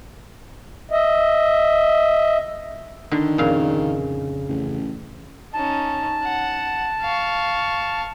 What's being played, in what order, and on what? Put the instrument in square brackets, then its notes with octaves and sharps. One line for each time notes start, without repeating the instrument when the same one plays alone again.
[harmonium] D#5 E5
[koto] D3 [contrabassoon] D#3
[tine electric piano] F2 C#3 [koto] A#2 F5
[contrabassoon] A1
[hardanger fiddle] C#4 D#4 [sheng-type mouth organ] A5
[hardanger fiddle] F#5
F5 C#6